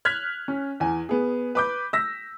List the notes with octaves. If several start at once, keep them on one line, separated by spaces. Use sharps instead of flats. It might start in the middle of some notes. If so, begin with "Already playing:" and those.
F6 F#6 G#6 B6
C#4
E2 G#5
B3 G#4
B4 D6 G6
E6 A#6 B6